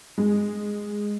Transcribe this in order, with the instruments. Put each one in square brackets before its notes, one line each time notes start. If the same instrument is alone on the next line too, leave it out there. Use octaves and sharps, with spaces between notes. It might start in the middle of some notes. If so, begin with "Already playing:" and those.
[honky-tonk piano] G#3